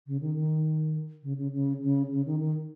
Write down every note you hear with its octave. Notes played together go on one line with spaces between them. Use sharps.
C#3
D#3
D#3
C#3
C#3
C#3
C#3
C#3
D#3
D#3